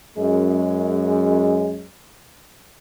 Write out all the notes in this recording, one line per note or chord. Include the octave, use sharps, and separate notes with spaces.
F#2 G#3